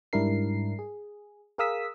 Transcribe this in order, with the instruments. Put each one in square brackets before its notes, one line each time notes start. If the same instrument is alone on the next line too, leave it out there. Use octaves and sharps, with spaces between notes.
[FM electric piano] G#2 G3 D4 E4 A#4 C7
G#4
G#4 A#4 F5 D#6 E6 B6